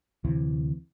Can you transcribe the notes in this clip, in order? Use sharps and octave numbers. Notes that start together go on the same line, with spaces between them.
D2 C3 E3